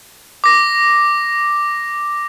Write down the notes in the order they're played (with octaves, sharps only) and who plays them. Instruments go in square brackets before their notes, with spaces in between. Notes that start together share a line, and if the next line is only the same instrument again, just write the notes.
[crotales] D6 A#6